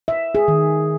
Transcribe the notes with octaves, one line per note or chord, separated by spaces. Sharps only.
E5
G#4
D#3